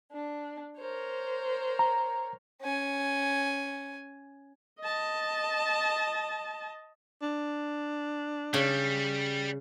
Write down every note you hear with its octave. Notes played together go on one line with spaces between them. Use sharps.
D4
A#4 C5 C#5
A#5
C#4 G#5
D#5 A5
D4
C#3 G3